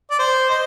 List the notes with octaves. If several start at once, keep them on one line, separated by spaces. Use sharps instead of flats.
D5
C5
C5 D#5